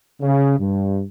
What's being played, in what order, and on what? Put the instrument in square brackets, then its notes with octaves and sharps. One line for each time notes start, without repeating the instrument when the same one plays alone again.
[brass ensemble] C#3
G2